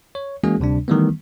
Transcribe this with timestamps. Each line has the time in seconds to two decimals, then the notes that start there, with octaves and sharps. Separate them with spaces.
0.15 C#5
0.43 E3 G#3 A#3 C#4 F#4 G#4
0.60 D2 C3 G3 D4
0.88 D#3 E3 G3 A3 B3